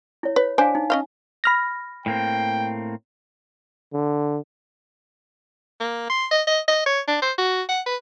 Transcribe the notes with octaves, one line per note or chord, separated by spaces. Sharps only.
E4 C#5
B4 C#5
D4 C5 D5 F5 G#5
D#4
C#4 D#5 F5
B5 F6 A#6
A2 A#3 C4 G5
D3
A#3
C6
D#5
D#5
D#5
C#5
D4
C5
F#4
F#5
B4